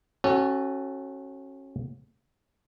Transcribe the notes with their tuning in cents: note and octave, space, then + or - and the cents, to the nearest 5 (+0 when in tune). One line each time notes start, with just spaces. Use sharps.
C#4 -25 F#4 +20 A4 +0